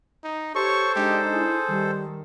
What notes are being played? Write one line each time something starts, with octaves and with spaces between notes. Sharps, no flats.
D#4
G4 A4 C5 C#5 C#6
G#3 D4 D#4 G4 D#5
E4 G#4
D#3 G3